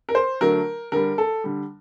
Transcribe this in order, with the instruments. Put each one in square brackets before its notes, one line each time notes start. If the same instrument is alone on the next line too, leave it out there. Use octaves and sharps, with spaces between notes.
[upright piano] A#4
C5
D3 F#3 A3 A#4
D3 G3 A#4
A4
D3 G3